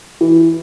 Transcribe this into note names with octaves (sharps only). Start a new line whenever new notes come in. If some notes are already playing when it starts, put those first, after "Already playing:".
E3